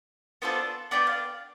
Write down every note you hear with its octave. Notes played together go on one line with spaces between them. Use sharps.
B3 D4 F4 A4 C5
B3 D4 G4 D5
F5